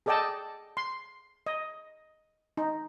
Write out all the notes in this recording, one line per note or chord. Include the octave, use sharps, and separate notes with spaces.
G#4 A4 D5 D#5 G5 A5
C6
D#5
D#4